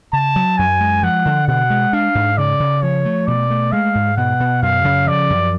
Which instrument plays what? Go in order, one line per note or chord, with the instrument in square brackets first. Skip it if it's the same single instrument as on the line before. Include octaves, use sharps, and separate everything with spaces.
[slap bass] C#3 [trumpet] A5
[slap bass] F#3
[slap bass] F#2 [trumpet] G#5
[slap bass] G#3
[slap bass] F3 [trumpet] F#5
[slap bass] D3
[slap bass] B2 [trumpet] F#5
[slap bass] G#3
[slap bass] D4 [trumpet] F5
[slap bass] G#2
[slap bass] C#3 [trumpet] D5
[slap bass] C#3
[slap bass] F3 [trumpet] C#5
[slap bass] A3
[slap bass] B2 [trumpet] D5
[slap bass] A3
[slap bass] G#3 [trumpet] F5
[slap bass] G#2
[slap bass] B2 [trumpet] F#5
[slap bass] B2
[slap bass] F#2 [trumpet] F5
[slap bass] C#3
[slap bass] F3 [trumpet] D5
[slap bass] F#2